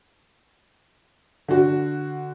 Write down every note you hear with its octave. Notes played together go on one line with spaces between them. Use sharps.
D3 F#4